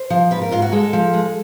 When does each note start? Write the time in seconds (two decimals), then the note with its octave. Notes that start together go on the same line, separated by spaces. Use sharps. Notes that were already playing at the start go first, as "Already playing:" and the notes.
Already playing: C5
0.10 F3
0.31 G#2 B4
0.42 A#4
0.51 G#2 F4
0.62 F#4
0.72 G#3 A4
0.93 F3
1.14 G#3